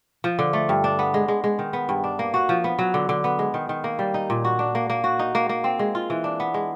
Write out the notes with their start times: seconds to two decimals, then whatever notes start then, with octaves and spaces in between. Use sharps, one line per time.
0.24 F3
0.39 D3
0.53 A3
0.69 G2
0.84 D4
0.99 B3
1.14 G#3
1.28 G#3
1.44 G#3
1.59 D#3
1.73 B3
1.89 G2
2.04 D4
2.19 A#3
2.34 F#4
2.49 F3
2.64 B3
2.79 F#3
2.94 D3
3.09 D3
3.24 B3
3.39 G#3
3.54 D#3
3.69 D#3
3.84 A#3
3.99 G3
4.14 D#4
4.30 A#2
4.45 F#4
4.59 D4
4.75 A#3
4.90 A#3
5.04 F#4
5.19 D#4
5.35 A#3
5.49 A#3
5.64 C4
5.79 G#3
5.95 F4
6.10 E3
6.24 D4
6.40 B3
6.54 G#3